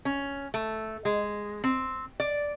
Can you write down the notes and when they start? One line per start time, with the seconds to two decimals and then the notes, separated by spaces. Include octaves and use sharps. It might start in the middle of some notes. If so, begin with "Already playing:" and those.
0.05 C#4
0.54 A3
1.05 G#3
1.64 C4
2.20 D5